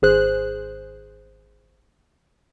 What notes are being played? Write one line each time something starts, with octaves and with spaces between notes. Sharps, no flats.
G#1 G#4 C5 F#6